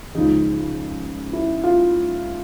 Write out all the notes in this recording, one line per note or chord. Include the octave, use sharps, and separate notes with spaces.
C#2 C#3 F3 G#3 D#4
E4
F4